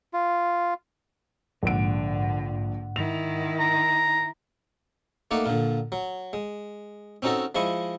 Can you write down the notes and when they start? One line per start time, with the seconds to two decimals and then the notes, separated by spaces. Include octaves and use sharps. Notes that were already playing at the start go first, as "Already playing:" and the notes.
0.13 F4
1.63 A#1 G#2 D3 F#5 D7
2.96 D#3 E4 F7
3.60 A#5
5.31 A3 A#3 D#4 D5 F#5
5.46 A#2 D3
5.92 F#3
6.33 G#3
7.22 C4 C#4 D#4 F#4 A4 D#5
7.55 F3 G#3 E4 D#5 C#6